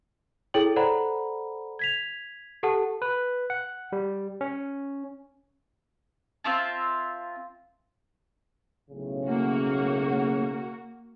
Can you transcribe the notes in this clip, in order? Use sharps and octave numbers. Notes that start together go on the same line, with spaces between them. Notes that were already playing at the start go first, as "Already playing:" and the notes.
E4 G#4 A4 C#5 G5 F#7
A4 C5 D5 F#5 A#5 B5
G#6 B6 F7
G4 A4 F#5 A5
B4
F#5
G3
C#4
C4 F4 E5 A5
B1 A2 C#3
A#3 F#4